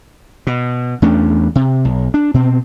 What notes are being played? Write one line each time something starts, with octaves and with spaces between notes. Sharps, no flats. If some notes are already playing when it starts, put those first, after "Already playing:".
B2
E2 A3 C#4 D4
C3
B1
D4
B2 C4